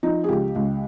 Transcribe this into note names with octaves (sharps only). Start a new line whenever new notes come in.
F3 D#4
G#4
C#2 G4
C#2